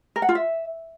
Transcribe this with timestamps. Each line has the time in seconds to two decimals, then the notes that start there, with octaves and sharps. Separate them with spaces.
0.16 A#4
0.22 F#5
0.29 F4
0.35 E5